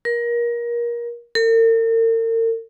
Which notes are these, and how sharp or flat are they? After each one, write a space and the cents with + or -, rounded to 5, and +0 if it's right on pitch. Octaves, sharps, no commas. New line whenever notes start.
A#4 +25
A#4 -45